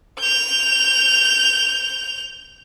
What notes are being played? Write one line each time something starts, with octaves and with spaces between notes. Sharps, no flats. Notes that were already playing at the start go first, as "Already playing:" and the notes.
G6 F7